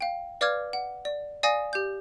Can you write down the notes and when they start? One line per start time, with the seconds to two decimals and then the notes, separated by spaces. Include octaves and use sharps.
0.01 F5 G5
0.41 B4 D5 F5 D6 F6 G#6
0.73 F#5
1.05 D5
1.43 D5 F5 G#5 D#6 A#6
1.73 G4 G6